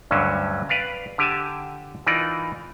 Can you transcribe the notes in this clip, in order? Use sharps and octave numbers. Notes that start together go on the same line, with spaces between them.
D2 G2 D3 F#3 C#4
B4 D5 F5
D3 G4 G#5 A5
E3 D#4 F4 A#4 D5